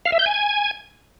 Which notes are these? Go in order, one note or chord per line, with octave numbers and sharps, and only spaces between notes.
F5
E5
G6
G#5